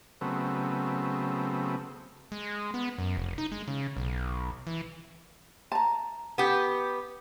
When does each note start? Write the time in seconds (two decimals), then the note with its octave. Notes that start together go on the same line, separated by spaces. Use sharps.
0.21 C#3 F#3 A3 B3 C4
2.32 G#3
2.74 B3
2.98 F#2
3.17 F1
3.38 D#4
3.52 G#3
3.68 C#3
3.96 B1
4.67 E3
5.72 A5 A#5
6.38 B3 G4